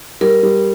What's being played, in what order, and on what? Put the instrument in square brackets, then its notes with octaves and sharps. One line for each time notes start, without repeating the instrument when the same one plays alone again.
[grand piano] G3 [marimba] A#4
[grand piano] G3